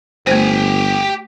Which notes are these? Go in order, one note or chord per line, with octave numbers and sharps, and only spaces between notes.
G1 A3 G4 C5 G#5